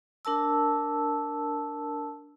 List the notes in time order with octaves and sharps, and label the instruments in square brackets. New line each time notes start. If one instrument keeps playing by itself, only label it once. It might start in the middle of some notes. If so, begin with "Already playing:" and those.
[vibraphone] D4 A#4 A5 E6